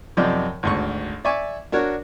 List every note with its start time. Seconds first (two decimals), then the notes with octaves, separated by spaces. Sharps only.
0.17 F#2 C3 F3 D#4 D5
0.63 G#1 D2 C#6
1.25 D5 E5 G#5 C#6 D6
1.72 D4 F#4 A#4 C#5